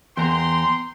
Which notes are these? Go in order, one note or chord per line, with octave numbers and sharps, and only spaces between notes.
E2 G5 A#5 C6